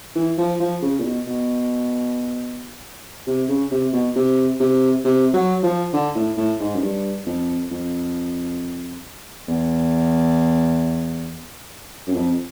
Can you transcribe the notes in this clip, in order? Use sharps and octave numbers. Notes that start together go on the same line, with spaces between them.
E3
F3
F3
C#3
A#2
B2
B2
C3
C#3
C3
B2
C3
C3
C3
F#3
F3
D3
A2
A2
G#2
F#2
G2
F2
F2
E2
F#2
F2